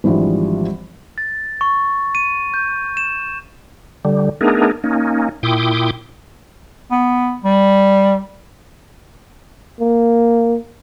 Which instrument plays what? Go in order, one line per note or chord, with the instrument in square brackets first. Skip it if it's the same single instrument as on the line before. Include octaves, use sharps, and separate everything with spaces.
[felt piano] G#1 E3 F3 G3 D4
[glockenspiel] A6
C#6
D#7
G6
E7
[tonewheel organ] D3 G3
A3 B3 D4 D#4 G#4 A#4
A#3 C#4 D#4
A#2 E4 G5 C6 D6 D#6
[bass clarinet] B3
G3
[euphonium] A#3